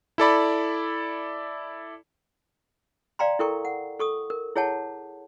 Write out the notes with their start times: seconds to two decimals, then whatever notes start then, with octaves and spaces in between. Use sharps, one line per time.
0.18 E4 A4 D5 B5
3.19 D5 F5 G5 A#5 C6
3.39 E4 A4 A#4 G5 C#6
3.65 F#5
3.99 A4 C#6 D#6
4.30 A#4
4.56 E4 G#4 C#5 F#5 A5